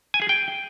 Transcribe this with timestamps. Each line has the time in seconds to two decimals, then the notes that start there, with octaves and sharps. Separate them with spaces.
0.14 G#5
0.22 G#4
0.29 G5